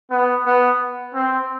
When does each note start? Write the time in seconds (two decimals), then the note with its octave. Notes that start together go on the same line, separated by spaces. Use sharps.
0.11 B3
0.46 B3
1.15 C4